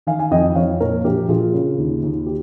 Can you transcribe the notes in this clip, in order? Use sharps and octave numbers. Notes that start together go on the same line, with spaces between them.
D#3 F5 G#5
G#5
F2 D#5 G5
F2 C#5 F5
A#2 A#4 C#5
A#1 G4 A#4
A#1 F4 G#4
C#3
D#2
D#2
G4